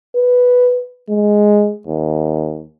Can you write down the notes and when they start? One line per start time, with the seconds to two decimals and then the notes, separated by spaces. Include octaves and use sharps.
0.16 B4
1.09 G#3
1.87 D#2